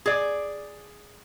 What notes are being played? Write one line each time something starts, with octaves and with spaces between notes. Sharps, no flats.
G#4 D5